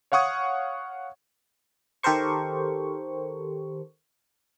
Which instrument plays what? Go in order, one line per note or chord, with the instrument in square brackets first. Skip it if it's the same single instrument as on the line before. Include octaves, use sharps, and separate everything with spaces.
[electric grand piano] C#5 F5 F#5 C#6 D#6 G#6
[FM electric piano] D#3 G4 A4 A#4 C5 C#6